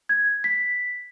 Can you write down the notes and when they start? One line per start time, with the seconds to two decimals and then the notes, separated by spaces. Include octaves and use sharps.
0.09 G#6
0.44 B6